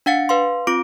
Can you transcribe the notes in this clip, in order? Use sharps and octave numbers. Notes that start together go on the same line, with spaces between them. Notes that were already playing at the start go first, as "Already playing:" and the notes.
D4 F5 F#5 A6 C#7
B4 F5 C6
C4 F4 D6 D7